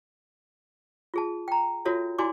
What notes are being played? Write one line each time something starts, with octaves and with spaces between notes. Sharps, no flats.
F4 G#4 A5
G5 A#5
F4 F#4 A4 C#5 E5
E4 F#4 D5 G#5 C6 D6